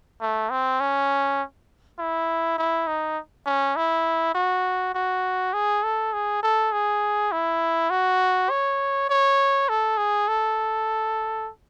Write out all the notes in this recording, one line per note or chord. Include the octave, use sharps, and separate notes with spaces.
A3
C4
C#4
E4
E4
D#4
C#4
E4
F#4
F#4
G#4
A4
G#4
A4
G#4
E4
F#4
C#5
C#5
A4
G#4
A4